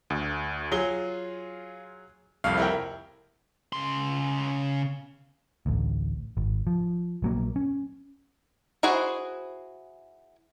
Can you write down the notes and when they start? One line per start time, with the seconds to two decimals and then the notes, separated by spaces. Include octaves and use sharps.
0.10 D2
0.72 F#3 F4 G#4 G7
2.44 C2 F2 F5
2.58 E4 A#4 G5
3.73 C#3 C6
5.66 A1 D2
6.37 G#1
6.67 F3
7.22 A#1 F#3 A#3
7.56 C#4
8.83 E4 F#4 G#4 C5